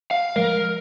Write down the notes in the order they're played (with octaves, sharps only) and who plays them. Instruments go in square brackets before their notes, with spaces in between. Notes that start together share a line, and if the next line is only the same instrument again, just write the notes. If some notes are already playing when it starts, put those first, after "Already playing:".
[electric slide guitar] F5
[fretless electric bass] F3 G#3 [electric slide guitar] A#4